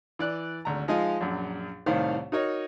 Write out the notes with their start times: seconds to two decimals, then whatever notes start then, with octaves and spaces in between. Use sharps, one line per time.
0.19 E3 D5 F#6
0.65 G#1 D2 A#5
0.88 F3 G#3 D#4 D#5 F5
1.21 A#1 F#2
1.86 C2 A2 D#3 C5 F5
2.32 D#4 F#4 A#4 C#5 D#5